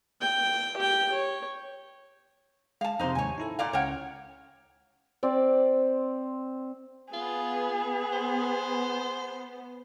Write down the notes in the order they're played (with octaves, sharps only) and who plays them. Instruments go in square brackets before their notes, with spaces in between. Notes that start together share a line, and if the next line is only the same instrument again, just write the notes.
[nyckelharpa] G5
G4 G5
C#5
[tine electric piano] G#3 [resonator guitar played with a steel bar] F5 A5
[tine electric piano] F2 C3 [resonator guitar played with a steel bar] D#4 C5
[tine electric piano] D#2 G#2 [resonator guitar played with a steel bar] C#5 G#5
[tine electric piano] D#4 E4 A4
[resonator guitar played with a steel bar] A#2 D5 F5
[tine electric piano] C#2 C#4 F6 [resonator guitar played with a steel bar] C#5 F#5 G5
[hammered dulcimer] C4 D5
[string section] B3 [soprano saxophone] F4 [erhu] G#4
[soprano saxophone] C5